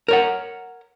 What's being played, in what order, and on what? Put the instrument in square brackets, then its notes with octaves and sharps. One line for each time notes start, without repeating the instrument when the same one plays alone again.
[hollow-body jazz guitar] A#4 C#5 F#5